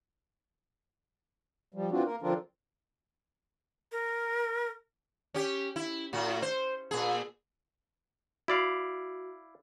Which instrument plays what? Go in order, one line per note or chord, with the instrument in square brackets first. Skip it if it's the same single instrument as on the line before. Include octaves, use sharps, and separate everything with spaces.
[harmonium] F3 G3
E3 C4 D4 F4 F#4
A#3 A#4
D3 F3 C4 D4 F4 A#4
[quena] A#4
[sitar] C#4 G4
E4
A2 F#4
C5
A#2 G#4
[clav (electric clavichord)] E4 D5 F5 [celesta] F#4